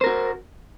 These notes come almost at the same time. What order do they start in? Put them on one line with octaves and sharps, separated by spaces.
C5 A#4 F#4